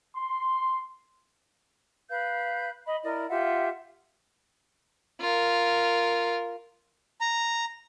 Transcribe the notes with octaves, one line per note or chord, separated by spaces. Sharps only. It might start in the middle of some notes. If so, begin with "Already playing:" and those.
C6
B4 F5 G6
D#5 B5
E4 A#4 D5 D#5
F4 G4 E5 F#5
F4 A#4
A#5